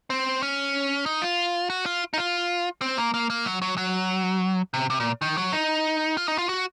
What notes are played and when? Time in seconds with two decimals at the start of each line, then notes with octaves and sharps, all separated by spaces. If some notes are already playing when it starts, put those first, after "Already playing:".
0.10 C4
0.43 C#4
1.06 D#4
1.22 F4
1.70 F#4
1.86 F4
2.13 D#4
2.18 F4
2.81 C4
2.98 A#3
3.14 A#3
3.30 A#3
3.45 F#3
3.62 F#3
3.78 F#3
4.74 C3
4.90 C3
5.00 A#2
5.22 D#3
5.37 F#3
5.53 D#4
6.17 F4
6.28 D#4
6.38 F4
6.49 F#4